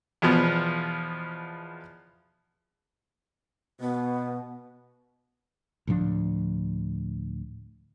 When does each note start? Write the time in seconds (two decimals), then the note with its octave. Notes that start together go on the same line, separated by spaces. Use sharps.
0.22 E2 B2 F3 B3
3.80 B2 B3
5.87 D2 A2 F3 D4